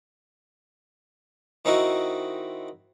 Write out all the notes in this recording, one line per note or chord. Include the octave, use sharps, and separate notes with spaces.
D#3 C4 D#4 E4 F#4